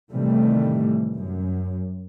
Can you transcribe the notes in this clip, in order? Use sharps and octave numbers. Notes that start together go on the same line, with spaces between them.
A2 C3 D#3 E3 G3 A3
F#2